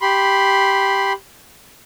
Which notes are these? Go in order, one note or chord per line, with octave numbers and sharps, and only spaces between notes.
G4 B5 C6